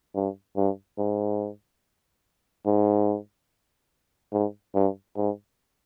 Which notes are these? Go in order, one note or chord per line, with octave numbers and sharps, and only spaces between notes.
G2
G2
G#2
G#2
G#2
G2
G#2